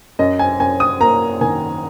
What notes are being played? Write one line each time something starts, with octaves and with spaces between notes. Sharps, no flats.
F#2 D#5
G#5
F#2 G#5
D#6
A#3 A#5
D#3 G#5